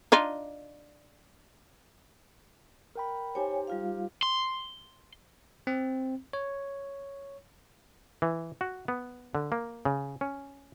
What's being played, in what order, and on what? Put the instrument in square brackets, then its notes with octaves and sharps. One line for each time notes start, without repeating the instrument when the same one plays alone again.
[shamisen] D4 D#4 F4
[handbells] A#4 G5 B5
[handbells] D#4 G4 C5 [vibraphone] C#5 G5 G#5
[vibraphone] G3 F4 F5
[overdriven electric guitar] C6
[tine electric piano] C4
C#5
[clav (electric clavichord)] E3
F#4
B3
D3
A#3
C#3
C#4